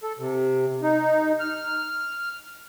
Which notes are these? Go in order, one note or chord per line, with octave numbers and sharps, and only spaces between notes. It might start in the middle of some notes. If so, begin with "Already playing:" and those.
A4
C3
D#4
F6